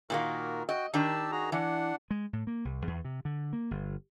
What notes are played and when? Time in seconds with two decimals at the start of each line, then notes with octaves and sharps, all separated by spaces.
0.10 A#2 D#3 A#3 F#4 A#4
0.69 F#4 D#5 G5
0.94 D#3 D4 G4 A#4 A5 E6
1.32 F#4 G#4 A#5
1.52 E3 D4 F#5
2.11 G#3
2.33 A2
2.47 A#3
2.65 C2
2.87 E2
3.05 C3
3.25 D3
3.53 A#3
3.71 G1